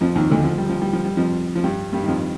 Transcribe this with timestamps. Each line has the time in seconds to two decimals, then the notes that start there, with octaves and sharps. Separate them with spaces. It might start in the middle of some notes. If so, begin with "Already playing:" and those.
0.01 F2 F3
0.15 D#2 D#3
0.30 D2 D3
0.45 F3
0.58 G3
0.69 F3
0.82 G3
0.93 F3
1.05 G3
1.17 F2 F3
1.55 F3
1.64 G2 G3
1.93 G2 G3
2.03 D#3
2.08 F2 F3